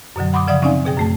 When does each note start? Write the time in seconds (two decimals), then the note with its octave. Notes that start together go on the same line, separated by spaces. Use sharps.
0.16 F#2 B2 D3 F#3
0.33 F#5 B5 C6 D6 D#6
0.47 C#3 F3 D5 E5 F#5 D#6
0.62 C4 C#4 D#4 D5 F5 G#5
0.85 B2 G#4 G5
0.97 F#2 A3 A5